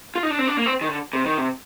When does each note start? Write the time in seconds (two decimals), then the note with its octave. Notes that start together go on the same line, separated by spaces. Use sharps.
0.15 F4
0.23 D#4
0.30 D4
0.39 C4
0.47 D4
0.57 A#3
0.66 C4
0.81 D#3
0.88 D3
1.13 C3
1.25 D#3
1.38 C3